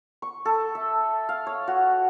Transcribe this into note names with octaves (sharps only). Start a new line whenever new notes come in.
C#6
A4
E5
F5
C#5
F#4